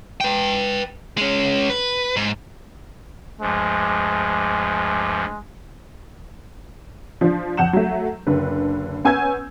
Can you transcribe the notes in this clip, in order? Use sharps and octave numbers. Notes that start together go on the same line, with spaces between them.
B4 G5
G#3 C#4
B4
G#2
D2 G2 F3 G#3
F3 D4 F4
F2 F#5 G6 E7
F#3 A3
F#1 D3 B4
B3 C#4 G#5 E6 G6 G#6